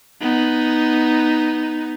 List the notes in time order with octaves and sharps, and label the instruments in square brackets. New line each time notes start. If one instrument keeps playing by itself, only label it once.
[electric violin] B3 D#4